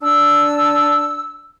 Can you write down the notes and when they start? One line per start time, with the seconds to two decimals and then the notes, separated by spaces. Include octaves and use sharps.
0.01 D4 E6